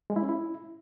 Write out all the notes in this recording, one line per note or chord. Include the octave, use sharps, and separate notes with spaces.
G#3
E4
C#4
E4